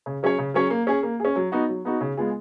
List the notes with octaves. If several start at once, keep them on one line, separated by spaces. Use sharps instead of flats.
C#3
F#3 C#4 G#4 C#5
C#3
F#3 C#4 G#4 C#5
A#3
C#4 G#4
A#3
C#4 G#4
F#3
B3 D#4 F#4
F#3
B3 D#4 F#4
C#3
G#3 B3 F4 G#4